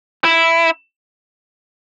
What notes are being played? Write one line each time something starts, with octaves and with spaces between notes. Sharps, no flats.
E4